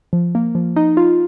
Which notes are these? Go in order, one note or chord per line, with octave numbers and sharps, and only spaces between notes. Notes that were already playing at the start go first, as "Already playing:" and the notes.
F3
A#3
F3
D#4
F4